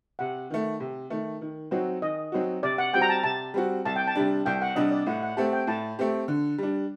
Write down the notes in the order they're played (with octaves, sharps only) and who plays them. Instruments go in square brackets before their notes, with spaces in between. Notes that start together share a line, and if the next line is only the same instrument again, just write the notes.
[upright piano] C3 [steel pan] F#5
[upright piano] D#3 A3
C3
D#3 A3
D#3
F#3 C4 D#4 F#4
[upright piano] D#3 [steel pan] D#5
[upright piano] F#3 C4 D#4 F#4
[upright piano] C3 [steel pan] D5
[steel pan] F#5
[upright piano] G3 C4 F#4 [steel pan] G5
[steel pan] A#5
A5
[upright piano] C3 [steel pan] A5
[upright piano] G3 C4 F#4
[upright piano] C2 [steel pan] A5
[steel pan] G5
A5
[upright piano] C3 G3 D4
[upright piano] C2 [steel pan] G5
[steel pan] F#5
[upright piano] C3 G3 D4 [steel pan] D#5
[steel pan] D5
[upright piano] A2 [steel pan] F#5
[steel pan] F#5
[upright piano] A3 C4 G4 [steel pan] A5
[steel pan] G5
[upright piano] A2 [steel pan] A5
[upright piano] A3 C4 G4
D3
G3 D4